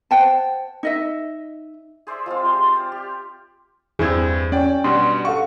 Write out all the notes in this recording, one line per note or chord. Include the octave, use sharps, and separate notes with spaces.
C5 F#5 G5 A5
D#4 D#5 E5
G#4 C5 D5 E5
F3 G#3 C4 F4
G#3 G4
D5
G5
G4
E2 G2 C4 E4 G#4 G#6
C#4 D5 G5
B2 G3 D4 F#4 C6
A4 F5 F#5 C#6